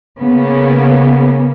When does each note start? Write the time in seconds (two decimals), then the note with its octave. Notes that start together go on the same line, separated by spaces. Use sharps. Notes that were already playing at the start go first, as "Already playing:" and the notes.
0.19 C#3 A#3 B3